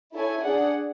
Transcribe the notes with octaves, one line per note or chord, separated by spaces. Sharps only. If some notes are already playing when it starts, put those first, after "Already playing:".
E4 A4 C#5 G#5
D4 G#4 D5 F#5